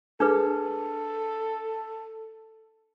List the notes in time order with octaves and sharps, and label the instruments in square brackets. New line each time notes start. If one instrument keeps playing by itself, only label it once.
[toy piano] D4 G#4 B4 [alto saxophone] A4